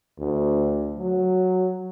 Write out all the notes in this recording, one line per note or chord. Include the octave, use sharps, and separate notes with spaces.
D2
F#3